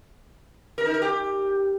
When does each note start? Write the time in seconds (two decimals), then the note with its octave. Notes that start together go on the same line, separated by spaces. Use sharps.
0.78 A#4
0.86 D#4
0.94 A#4
1.02 G4